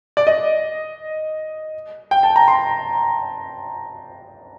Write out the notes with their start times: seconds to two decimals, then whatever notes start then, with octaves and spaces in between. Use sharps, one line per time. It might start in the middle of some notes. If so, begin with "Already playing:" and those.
0.17 D5
0.27 D#5
2.11 G5
2.23 A5
2.36 A#5
2.48 C6